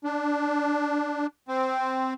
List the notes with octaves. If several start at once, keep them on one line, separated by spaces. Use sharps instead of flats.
D4
C4